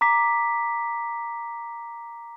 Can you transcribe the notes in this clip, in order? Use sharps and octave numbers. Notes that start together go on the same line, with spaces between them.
A#5 D6 B6